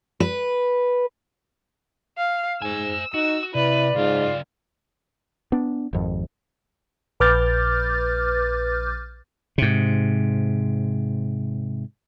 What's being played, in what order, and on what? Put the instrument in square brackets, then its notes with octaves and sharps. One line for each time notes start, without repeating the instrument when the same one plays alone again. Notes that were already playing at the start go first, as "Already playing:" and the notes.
[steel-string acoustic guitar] B4
[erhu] F5
[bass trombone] G#2 [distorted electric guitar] C5 G#5 [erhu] E6
[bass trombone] D#4 [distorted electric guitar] F#4 [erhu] E6
[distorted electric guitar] C3 [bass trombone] E4 [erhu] B4 [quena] D5
[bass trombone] G#2 [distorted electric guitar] C#3 A#4 [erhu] F4
[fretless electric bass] B3 D4
G#1 F2
[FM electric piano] A#1 B4 D6 F6 G6 A6
[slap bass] G#2 C3